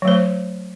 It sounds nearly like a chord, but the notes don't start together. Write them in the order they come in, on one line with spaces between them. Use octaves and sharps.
F#3 A3 C5